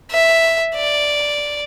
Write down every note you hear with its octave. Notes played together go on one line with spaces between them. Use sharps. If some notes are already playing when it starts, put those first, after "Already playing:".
E5
D5